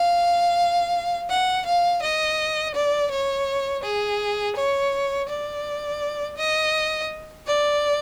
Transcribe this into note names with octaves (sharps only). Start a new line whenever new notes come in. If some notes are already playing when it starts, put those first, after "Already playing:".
Already playing: F5
F#5
F5
D#5
D5
C#5
G#4
C#5
D5
D#5
D5